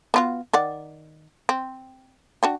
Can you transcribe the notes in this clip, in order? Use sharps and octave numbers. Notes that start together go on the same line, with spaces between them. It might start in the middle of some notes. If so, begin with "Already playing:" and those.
B3 F4 F#4
D#3 D5 F#5
C4
D4 F#4 G5